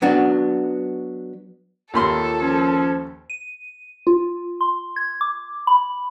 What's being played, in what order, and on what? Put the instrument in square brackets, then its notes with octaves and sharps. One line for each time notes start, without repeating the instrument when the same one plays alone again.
[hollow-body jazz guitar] F#3 B3 D4 F#4
[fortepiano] D#2 B5 C6 [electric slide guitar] F4 A#4 C#5 [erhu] A4
[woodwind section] F3 C#4
[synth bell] D#7
F4
C6
G#6
D6
B5